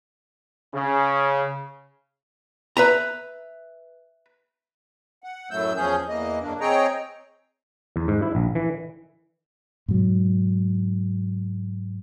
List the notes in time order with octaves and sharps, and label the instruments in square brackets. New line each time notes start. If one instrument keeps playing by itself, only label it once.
[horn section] C#3
[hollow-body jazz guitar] B4 E5 A#5
[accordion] F#5
F#2 A2 F#3 A3 E6 G6
E2 F3 C#4 G#4 G6
E2 E3 A#3 D#5
F#2 C#3 A#3 D4
C4 G#4 C#5 D#5 G5 A#5
[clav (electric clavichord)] E2
G#2
E4
A#1
E3
[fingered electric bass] G#2 B2 F#3